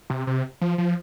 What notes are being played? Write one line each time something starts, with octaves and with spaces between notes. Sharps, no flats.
C3
C3
F3
F3